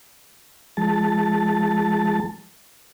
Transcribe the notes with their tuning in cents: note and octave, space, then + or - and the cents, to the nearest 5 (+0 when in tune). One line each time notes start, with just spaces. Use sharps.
F3 -25 G#3 +0 A5 +0